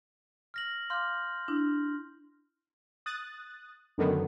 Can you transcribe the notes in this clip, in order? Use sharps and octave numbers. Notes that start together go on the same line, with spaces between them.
F6 A#6 F#7
F5 C6 D6 F6 G6
D4 E4
D#6 F#6 A6
F#2 D3 D#3 F#3 B3